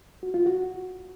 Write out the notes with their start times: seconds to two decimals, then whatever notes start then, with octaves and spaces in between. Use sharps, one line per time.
0.23 F#4
0.34 F4
0.46 F#4